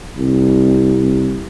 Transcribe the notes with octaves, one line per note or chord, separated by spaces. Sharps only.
C2